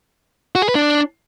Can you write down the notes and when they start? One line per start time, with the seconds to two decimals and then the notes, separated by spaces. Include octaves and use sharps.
0.55 F#4
0.62 G#4
0.69 B4
0.75 D4